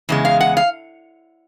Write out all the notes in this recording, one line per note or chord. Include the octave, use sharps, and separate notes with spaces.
E2 C#3 G#3
F5
F#5
F5